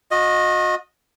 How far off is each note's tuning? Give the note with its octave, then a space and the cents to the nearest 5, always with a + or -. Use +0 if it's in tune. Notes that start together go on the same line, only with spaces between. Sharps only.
F#4 -40 D#5 +0